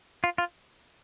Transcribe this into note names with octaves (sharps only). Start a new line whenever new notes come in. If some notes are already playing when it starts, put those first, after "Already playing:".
F4
F4